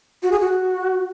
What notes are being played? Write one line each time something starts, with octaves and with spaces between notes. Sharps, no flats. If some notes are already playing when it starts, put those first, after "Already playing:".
F#4
G#4
F#4